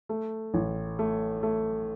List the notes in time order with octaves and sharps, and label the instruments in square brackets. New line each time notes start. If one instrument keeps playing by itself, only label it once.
[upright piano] A3
A1
A3
A3